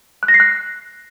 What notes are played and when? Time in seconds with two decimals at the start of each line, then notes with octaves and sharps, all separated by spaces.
0.23 F#6
0.28 A#6
0.34 C7
0.40 F#6